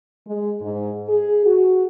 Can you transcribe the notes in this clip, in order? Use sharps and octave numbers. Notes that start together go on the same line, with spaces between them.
G#3
G#2
G#4
F#4